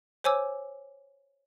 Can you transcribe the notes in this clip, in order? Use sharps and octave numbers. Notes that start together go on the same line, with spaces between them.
C5 C#5 G#5 D6 E6